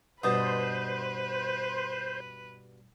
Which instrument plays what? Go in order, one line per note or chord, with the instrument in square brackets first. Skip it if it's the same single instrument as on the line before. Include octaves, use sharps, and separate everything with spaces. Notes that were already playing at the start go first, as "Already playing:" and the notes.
[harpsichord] G2 B2 [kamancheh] B4 [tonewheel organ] C5 [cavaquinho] D#5 A5